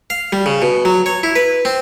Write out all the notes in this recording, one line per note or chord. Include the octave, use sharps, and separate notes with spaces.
F5
G3
C#3
B2
F#3
C#5
E4
B4
C4